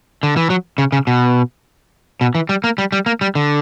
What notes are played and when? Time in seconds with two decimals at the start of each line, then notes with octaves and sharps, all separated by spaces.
0.23 D3
0.37 E3
0.50 F#3
0.78 C#3
0.92 C#3
1.07 B2
2.21 B2
2.35 E3
2.49 G3
2.64 A#3
2.78 G3
2.92 G3
3.06 A#3
3.21 G3
3.35 D3